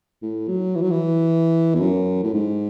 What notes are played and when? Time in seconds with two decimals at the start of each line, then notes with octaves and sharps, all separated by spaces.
0.22 A2
0.48 F#3
0.75 E3
0.82 F#3
0.90 E3
1.74 E2
1.80 F#2
2.23 A2
2.33 G#2